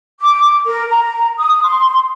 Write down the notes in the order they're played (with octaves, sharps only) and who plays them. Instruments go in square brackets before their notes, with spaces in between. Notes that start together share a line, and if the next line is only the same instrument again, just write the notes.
[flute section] D6
A#4
A#5
D#6
C6